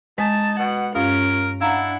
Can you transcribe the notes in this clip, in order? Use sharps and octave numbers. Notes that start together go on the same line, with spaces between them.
G#3 D#4 A5
B2 F#5
G2 C#4 F4 A#4 F5 D#6
D4 E4 F5 F#5 A#5